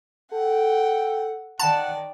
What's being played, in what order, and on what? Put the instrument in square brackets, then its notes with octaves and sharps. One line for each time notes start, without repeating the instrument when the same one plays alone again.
[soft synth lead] A4 [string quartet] F#5 [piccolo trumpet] G5
[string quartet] D#3 D5 [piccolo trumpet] F#5 [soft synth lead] G5 [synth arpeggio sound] A5